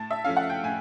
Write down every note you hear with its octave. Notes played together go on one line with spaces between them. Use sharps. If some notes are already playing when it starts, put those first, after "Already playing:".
Already playing: A2 A5
E5
F3 A3 C#4 F5
F#5
G5
A2 G#5